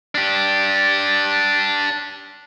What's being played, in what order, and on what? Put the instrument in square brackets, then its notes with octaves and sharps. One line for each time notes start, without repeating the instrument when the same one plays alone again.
[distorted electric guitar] D4 G4